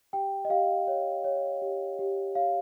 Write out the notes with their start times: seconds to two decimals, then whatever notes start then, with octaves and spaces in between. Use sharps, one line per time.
0.13 G4 G5
0.45 D#5
0.50 G4 F5
0.87 C#5
1.24 C#5
1.62 G4
1.99 G4
2.35 C#5 F5